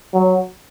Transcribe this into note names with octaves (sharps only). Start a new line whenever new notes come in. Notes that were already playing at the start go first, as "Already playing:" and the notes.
F#3